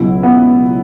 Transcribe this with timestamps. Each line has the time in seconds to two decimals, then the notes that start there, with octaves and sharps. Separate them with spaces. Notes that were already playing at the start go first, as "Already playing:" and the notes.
Already playing: C#2 B2 F#3 E4
0.23 B3